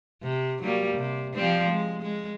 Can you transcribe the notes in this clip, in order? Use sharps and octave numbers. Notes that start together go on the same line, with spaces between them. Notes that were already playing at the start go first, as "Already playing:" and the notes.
C3
F#3 G3 A#3
C3
F3 G3 C4
G#3
G#3